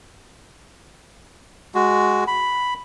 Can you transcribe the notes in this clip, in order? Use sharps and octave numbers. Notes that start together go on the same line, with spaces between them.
G#3 F#4
B5